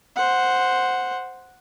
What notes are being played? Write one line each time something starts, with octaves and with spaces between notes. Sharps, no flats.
C5 F#5